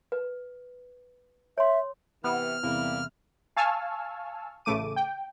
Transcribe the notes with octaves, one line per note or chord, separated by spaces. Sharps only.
B4
C#5 E5 C6
C3 E3 B3 F6
E2 C3 E3 G3 A#3 E4
F5 G#5 A5 C#6 E6 F6
A1 C#3 A3 D6 D#7
G5